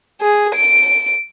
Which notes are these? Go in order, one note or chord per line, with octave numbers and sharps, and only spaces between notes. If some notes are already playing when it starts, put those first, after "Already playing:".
G#4
D7